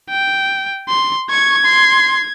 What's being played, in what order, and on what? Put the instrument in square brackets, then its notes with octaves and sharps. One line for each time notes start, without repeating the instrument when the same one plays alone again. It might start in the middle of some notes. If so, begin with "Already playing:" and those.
[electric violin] G5
C6
[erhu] C#6 [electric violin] G#6
[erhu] C6